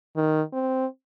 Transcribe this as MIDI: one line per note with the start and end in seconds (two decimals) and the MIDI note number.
0.16 0.42 51
0.53 0.86 60